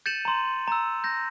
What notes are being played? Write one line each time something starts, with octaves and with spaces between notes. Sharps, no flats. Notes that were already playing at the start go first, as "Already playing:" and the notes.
G6 A6 C#7 D#7 E7 F#7
A#5 C6
A#5 E6
G6 A#6